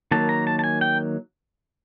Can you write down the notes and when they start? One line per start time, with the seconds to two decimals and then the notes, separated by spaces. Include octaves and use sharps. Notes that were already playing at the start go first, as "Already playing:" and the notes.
0.11 D#3 F#3 A#3 A5
0.29 A#5
0.47 A5
0.59 A5
0.64 G#5
0.81 G5